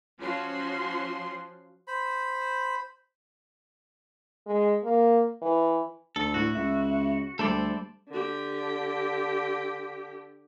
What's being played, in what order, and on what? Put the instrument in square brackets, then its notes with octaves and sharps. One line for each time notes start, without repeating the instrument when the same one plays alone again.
[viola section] F3 C#4 F#4 C6
[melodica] C5 B5
[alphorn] G#3
A#3
E3
[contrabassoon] D2 [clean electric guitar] A4
[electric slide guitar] A2 A3 E4 [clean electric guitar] F#4
[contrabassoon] C#2 [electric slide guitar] E5
[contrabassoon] D2 [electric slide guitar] G3 A3 [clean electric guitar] A4 C5 D5
[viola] D3 G4